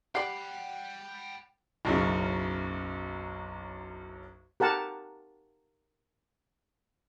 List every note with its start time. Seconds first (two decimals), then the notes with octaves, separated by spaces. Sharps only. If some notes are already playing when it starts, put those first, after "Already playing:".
0.15 G4 D5 F#5 G5 B5 C7
1.85 F#1 B1 F#2 C#3
4.60 G4 A#4 F#5 A5